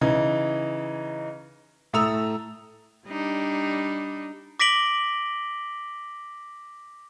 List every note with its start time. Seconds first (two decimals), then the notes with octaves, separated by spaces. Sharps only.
0.01 C#3 E3 D#4
1.93 A2 A3 A#5 D#6 E6 F7
3.08 G3 D4 D#4
4.60 D6 A#6 B6 D7 F#7 G7